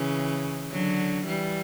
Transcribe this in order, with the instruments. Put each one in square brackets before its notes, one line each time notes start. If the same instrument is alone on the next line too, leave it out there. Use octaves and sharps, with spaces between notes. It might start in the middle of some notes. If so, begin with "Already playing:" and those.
Already playing: [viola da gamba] C#3 E3
D3 F#3
E3 G3